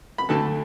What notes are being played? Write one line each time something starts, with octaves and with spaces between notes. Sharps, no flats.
B5
D2 D3 A3 A4 A5